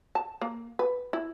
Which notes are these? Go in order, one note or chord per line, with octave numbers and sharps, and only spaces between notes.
A5
A#3
B4
E4